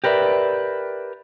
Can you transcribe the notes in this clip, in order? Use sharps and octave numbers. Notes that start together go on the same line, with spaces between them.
G4 A#4 B4 D5 E5